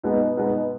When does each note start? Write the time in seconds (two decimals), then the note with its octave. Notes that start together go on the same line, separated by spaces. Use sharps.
0.03 B2 G#3 B3 D#4
0.37 B2 G#3 B3 D#4